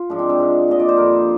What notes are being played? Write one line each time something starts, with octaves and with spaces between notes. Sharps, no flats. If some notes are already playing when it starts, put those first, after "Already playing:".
Already playing: F4
G#2 F3 D4
C4
C4
G#2 F3
A#2 F3 D#5
D5
C5
G2 D3 F3 A#4